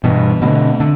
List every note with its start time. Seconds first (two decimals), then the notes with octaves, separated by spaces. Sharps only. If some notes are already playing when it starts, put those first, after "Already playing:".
0.04 G2 B2 E3
0.42 B2 D3 A3 C4
0.80 D3